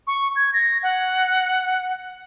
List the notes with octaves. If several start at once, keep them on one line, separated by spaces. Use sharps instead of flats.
C#6
G#6
A#6
F#5